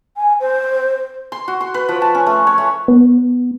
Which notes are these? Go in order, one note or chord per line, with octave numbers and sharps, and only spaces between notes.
G#5
C5
C6
F#4
C6
B4
F3
A5
C#4
A3
C#5
A3
B3